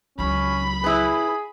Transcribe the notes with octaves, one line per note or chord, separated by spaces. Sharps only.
C#2 F#3 C#4 B5
E4 G#4 B4